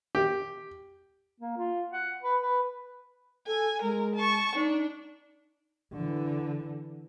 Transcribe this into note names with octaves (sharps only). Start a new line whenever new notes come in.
G4
A#3
F4
F#5
B4
B4
A4 G#5
G#3 A#4
A5 C#6
D4 D#4
D3 E3